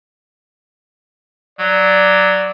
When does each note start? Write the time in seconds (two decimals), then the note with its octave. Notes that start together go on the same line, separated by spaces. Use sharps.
1.60 F#3 D5